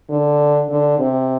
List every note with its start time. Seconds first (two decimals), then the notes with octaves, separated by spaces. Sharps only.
0.10 D3
0.69 D3
0.98 C3